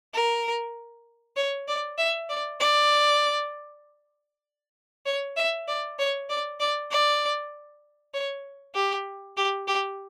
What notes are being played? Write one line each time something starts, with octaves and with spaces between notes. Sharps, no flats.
A#4
C#5
D5
E5
D5
D5
C#5
E5
D5
C#5
D5
D5
D5
C#5
G4
G4
G4